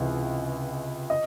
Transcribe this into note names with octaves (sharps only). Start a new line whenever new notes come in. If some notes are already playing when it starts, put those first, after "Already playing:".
Already playing: C#2 C3 E3
D#5